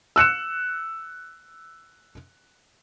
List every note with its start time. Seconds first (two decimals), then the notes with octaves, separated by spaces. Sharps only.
0.16 E6 F#6 C#7 E7